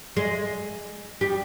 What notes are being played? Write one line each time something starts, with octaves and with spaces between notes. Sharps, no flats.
G#3
G3